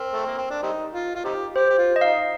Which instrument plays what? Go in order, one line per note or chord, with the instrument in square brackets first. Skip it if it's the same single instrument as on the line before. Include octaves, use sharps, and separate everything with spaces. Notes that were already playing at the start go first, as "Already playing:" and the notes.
Already playing: [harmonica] C4 [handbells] A#4
[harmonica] A3
A#3
C4
D4
G3 C4 D#4
F4
F4
C4 D#4 G4
[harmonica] G4 [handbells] C5
[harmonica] G4
F4
[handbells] D#5
[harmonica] D#4 [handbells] F5